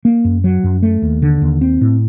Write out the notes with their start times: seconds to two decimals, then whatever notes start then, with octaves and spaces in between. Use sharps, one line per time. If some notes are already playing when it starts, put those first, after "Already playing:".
0.05 A#3
0.25 F#2
0.44 F#3
0.64 F#2
0.83 A3
1.02 D#2
1.22 D3
1.42 D#2
1.61 C4
1.81 A2